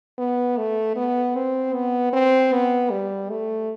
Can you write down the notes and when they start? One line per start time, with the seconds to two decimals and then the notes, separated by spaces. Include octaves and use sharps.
0.18 B3
0.57 A3
0.96 B3
1.35 C4
1.74 B3
2.13 C4
2.53 B3
2.91 G3
3.30 A3